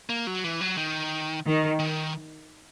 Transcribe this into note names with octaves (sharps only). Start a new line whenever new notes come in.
A#3
F#3
E3
F#3
D#3
D#3
D#3